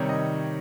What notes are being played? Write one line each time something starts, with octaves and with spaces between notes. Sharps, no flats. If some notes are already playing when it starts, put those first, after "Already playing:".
Already playing: C3 D#3 G3 C#5
D#5